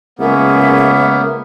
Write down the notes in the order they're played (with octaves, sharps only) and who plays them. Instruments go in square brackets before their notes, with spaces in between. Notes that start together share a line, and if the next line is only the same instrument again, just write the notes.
[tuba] C#2 [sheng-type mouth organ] A#3 B3 [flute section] C#4 G#4 E5